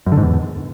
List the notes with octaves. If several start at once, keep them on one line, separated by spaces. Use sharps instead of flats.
F#2
D3
G#2
E2